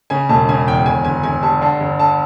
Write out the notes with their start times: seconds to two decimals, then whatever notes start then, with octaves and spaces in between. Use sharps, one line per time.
0.10 C#3 G#5
0.29 E1 A5
0.49 C#3 G#5
0.67 E2 G5
0.86 G1 G#5
1.05 G1 G#5
1.23 G1 G#5
1.43 G2 A5
1.61 D3 A5
1.80 G1
1.99 D3 A5